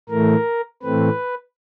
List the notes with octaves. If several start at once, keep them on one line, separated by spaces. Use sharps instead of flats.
A2 E3 A3 A#4
A2 E3 A3 C4 B4